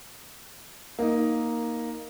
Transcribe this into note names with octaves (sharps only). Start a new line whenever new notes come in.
A#3 D#4